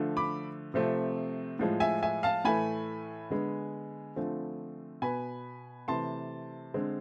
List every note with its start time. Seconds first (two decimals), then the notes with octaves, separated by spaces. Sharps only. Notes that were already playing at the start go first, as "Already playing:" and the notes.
Already playing: D3 F3 A3
0.17 B5 D6
0.74 C3 F3 A3 C4
1.59 A2 F3 G#3
1.80 E5 G#5
2.02 E5 G#5
2.23 F5 A5
2.44 A2 E3 A3 G#5 B5
3.30 D3 G#3 B3
4.16 D3 F3 A3 C4
5.02 B2 B3 G#5 B5
5.88 C3 E3 A3 A5 C6
6.74 D3 G#3 C4